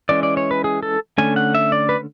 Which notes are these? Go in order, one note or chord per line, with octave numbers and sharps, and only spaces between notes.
E3 G#3 C#4 D5
D5
C#5
B4
G#4
A4
D3 A3 C#4 G#5
F#5
E5
D5
B4